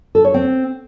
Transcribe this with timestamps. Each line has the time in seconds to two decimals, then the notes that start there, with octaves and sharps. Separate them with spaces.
0.15 A4
0.25 C#5
0.34 C4